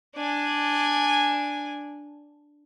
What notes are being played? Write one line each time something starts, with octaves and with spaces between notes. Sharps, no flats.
D4 G#5